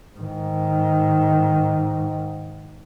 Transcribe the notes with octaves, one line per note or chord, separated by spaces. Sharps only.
G#2 D#3